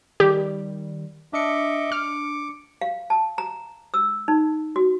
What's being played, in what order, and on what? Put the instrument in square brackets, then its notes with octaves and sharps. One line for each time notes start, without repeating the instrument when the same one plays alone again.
[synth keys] D#3 G3 [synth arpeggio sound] G4
[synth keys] D4 C#7 [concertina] D#5 E5 D6
[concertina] D6 [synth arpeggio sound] F6
[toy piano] F5
A5
A#5
E6
D#4
F#4